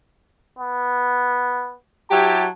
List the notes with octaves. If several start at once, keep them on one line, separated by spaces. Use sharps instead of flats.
B3
F#3 E4 G4 A5